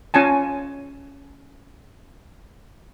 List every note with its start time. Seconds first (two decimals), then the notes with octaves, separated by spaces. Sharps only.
0.14 C#4 F4 G#5 A5